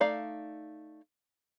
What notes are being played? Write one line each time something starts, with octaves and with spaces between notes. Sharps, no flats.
A3 D#4 D5 F5